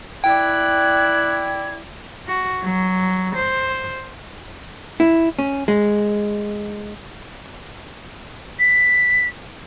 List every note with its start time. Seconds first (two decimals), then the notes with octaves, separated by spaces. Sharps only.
0.24 E4 D5 G5 F#6 G#6
2.27 F#4
2.62 F#3
3.35 C5
5.00 E4
5.39 C#4
5.68 G#3
8.59 B6